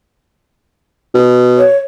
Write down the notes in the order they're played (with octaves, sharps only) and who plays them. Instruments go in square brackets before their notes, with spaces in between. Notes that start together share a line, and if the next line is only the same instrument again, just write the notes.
[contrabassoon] B2
[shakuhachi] C#5